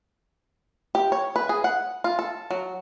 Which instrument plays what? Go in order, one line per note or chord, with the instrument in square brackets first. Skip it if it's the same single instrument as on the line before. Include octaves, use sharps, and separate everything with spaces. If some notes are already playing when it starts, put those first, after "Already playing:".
[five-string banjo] G4
C#5
B4
G#4
F#5
F4
A4
F#3